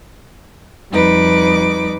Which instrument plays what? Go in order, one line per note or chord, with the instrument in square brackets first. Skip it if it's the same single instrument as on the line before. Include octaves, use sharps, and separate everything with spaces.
[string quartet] F2 G3 D#4 B4 D6